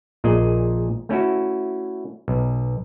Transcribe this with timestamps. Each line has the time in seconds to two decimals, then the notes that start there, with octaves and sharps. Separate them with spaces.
0.24 A#1 A#2 G#4 D#5 G#5
1.09 A3 C#4 E4 F#4
2.28 B1